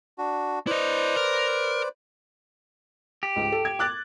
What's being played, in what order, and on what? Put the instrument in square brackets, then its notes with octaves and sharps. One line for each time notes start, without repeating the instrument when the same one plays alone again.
[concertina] D4 F#4
[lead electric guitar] E4 D#5 [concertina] B4 C5 D5
[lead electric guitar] A#4
[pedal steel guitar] G4
[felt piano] C#2 G#2
A4
G#6
D6 F#6 A6